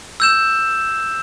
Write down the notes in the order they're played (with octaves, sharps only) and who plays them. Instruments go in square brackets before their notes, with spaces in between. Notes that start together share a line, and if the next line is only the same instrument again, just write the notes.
[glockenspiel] E6 G6 E7